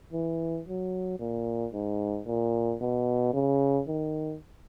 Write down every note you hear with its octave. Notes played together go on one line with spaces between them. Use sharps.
E3
F#3
A#2
G#2
A#2
B2
C#3
D#3